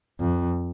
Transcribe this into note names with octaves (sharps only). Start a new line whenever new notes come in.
F2